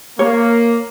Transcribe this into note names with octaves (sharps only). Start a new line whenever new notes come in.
A#3 C#5